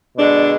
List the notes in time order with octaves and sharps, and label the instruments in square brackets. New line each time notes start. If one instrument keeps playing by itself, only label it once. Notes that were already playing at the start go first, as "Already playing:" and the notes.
[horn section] B2 D3 G#3 D4